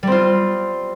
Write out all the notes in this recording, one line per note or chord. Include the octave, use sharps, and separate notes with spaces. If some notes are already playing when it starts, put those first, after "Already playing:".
G3 C4 F4